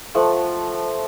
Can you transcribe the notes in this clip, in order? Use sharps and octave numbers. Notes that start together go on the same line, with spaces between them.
F3 A3 A4 F#5